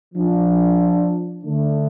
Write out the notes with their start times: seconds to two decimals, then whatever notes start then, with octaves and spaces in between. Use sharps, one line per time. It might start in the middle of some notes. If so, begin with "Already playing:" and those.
0.15 F3 D4
1.46 D3 A3 D4